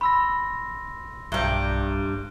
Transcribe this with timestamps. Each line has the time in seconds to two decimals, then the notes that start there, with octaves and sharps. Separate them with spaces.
0.01 B5 C6 E6 A#6
1.32 B1 G2 G3 E5 A#5 F#6 G7